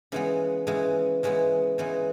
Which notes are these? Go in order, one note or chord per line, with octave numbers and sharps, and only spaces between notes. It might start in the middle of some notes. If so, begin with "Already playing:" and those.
C#3 E3 G#3 B3
C#3 E3 G#3 B3
C#3 E3 G#3 B3
C#3 E3 G#3 B3